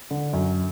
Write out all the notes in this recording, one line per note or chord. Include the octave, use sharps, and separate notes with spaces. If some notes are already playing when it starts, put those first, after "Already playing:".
D3
F#2